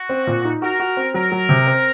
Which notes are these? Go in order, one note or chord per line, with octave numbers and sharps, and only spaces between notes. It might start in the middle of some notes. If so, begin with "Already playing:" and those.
Already playing: F#4
C4
A#2
D#4
F#4 A#4
F#4
C4
F#3 A#4
F#3
C3
C4